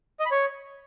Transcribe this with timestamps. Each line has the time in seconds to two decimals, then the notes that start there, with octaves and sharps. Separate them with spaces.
0.20 D#5
0.26 B5
0.31 C#5